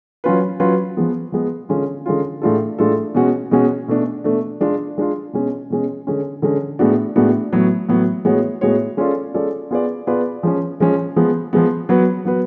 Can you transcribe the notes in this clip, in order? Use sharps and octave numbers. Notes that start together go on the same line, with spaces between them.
F#3 C#4 F4 B4
F#3 C#4 F4 B4
F3 G#3 B3
F3 G#3 B3
D3 G#3 C#4 F4
D3 G#3 C#4 F4
A2 G#3 D4 F4 A4
A2 G#3 D4 F4 A4
B2 G#3 C#4 F#4
B2 G#3 C#4 F#4
B2 A3 D4
B2 A3 D4
G#3 D4 F4
G#3 D4 F4
B2 G#3 C#4
B2 G#3 C#4
D3 G#3 C#4
D3 G#3 C#4
A2 G#3 B3 D4 F#4
A2 G#3 B3 D4 F#4
A2 F#3 B3
A2 F#3 B3
A2 G#3 B3 F#4 C#5
A2 G#3 B3 F#4 C#5
G#3 C#4 F4 A4 D5
G#3 C#4 F4 A4 D5
B3 F4 G#4 B4 D5
B3 F4 G#4 B4 D5
F3 G#3 C#4
F3 G#3 C#4
F3 G#3 B3
F3 G#3 B3
F#3 B3 F#4 B4
F#3 B3 F#4 B4